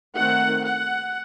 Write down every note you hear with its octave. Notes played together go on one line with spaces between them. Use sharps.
D#3 A3 C4 F#5
F#5